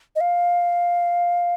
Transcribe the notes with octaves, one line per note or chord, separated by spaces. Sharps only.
D#5
F5